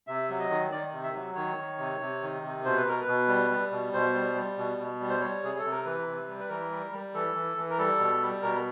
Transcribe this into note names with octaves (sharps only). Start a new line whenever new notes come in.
C3 E5
F#3
D#5
D#3
D#3 D5
C3
E5
F#3
D#3 C#5
D#3
C3
C3
D#3
C3
B2 C5
B4
B2 A#4
B4
B2
G3
G3
B2
B2 C5
G3
G3
B2
B2
G3
C5
G3 C#5
C3 G#4
A4
C3
A#4
E3 B4
C3
G3
B4
E3 A#4
G3
G3
E3 A4
E3
E3
A#4
G3 A4
B2
G3
B2 A#4